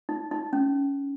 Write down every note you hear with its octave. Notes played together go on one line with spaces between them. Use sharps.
D#4
D#4
C#4